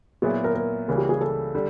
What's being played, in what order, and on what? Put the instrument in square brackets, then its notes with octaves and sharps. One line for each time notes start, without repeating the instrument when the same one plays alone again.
[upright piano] A#2 F#3 B3 E4 [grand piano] G#4
[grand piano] A#4
A#4
[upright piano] C#2 C#3 E3 G3 A#3
[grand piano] G4
G#4
A4
[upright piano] D3 G3